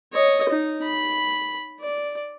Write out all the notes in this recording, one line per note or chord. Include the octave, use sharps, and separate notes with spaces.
C#5 D#5
D#4
B5
D5